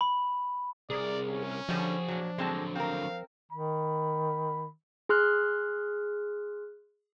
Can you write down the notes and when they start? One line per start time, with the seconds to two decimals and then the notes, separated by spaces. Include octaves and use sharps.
0.01 B5
0.90 C2 G#4 A#4 D5
1.29 C#4
1.69 D3 F3 G3 F#4 G#4 D#5
2.08 A#2 F#3 D4
2.38 D3 F#3 G#3 C4 A5
2.75 C4 A#4 F5
3.52 D#3 B5
5.09 G#4 C6 F6 F#6